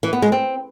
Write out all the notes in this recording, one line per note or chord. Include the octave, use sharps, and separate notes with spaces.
E3
B3
G#3
C4